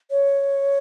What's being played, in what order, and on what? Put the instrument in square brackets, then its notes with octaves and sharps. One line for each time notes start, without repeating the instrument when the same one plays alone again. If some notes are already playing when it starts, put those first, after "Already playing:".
[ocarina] C#5